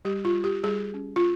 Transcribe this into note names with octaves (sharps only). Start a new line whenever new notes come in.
G3 G4
F4
G3
G4
G3 G#4
C#4
F4